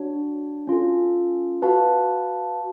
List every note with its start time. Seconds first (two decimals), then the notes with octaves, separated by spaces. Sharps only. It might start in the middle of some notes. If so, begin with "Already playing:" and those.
Already playing: D4 F#4 C#5
0.67 C#4 F4 A4
1.62 F#4 B4 F5 A5